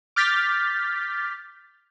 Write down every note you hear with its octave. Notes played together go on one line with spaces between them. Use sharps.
D6 F6 G6 A6 B6